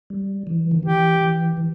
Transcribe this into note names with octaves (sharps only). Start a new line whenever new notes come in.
G3
E3
D#3
E3 G4
E3
E3